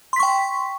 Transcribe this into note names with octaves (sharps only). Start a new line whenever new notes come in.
G5 C6 C#6 B6